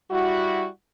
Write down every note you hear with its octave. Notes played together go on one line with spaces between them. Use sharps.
G3 E4 F#4